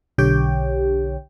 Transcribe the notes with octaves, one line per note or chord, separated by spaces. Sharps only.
B1 D3 G4 C#5 G5